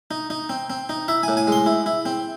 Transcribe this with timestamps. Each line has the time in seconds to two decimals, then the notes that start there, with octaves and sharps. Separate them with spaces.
0.11 D#4
0.30 D#4
0.49 C4
0.70 C4
0.89 D#4
1.08 E4 E5
1.23 G#5
1.28 A2
1.37 G#5
1.47 G#3 C6
1.66 E4
1.86 E4
2.06 C4